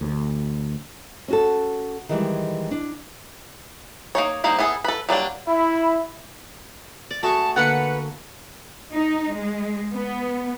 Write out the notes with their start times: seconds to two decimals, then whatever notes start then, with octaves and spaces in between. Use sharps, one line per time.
0.01 D2
1.28 C#4 F#4 A4
2.09 D#3 E3 G3 G#3
2.71 D4
4.15 A#3 D#4 C#5
4.44 G3 A#3 D#4 C5
4.59 B3 E4 G#4 A4
4.84 A4 B4
5.09 F#3 G3 A#3 D4
5.48 E4 E5 B5
7.11 D5
7.23 A3 F#4 G#4 D5 A5 C#6
7.56 D3 A#3 B4 F#5 C#7
8.92 D#4
9.33 G#3
9.92 B3